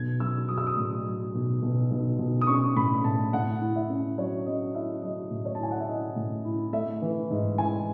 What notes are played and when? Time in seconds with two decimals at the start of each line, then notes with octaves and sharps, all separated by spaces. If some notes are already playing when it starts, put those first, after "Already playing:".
Already playing: B1 G#6
0.20 F#3 E6
0.49 F#3 D#6
0.58 E6
0.67 D#6
0.77 A2
1.06 F#3
1.35 B1
1.63 B1
1.91 B1
2.19 B1
2.41 D#6
2.47 C#4 C#6
2.76 A2 B5
3.04 A2 A5
3.33 A2 F#5
3.61 E4
3.76 E5
3.90 C#4
4.18 F#3 C#5
4.46 C#4 D#5
4.75 E4 E5
5.02 F#3 D#5
5.31 A2
5.45 C#5
5.55 A5
5.59 E4 G#5
5.71 F#5
5.80 E5
5.88 E4 D#5
6.16 A2
6.45 E4
6.73 A3 E5
7.02 E3
7.30 G#2
7.58 E3 G#5